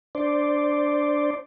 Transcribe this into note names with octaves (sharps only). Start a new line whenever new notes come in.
D4 C5 D5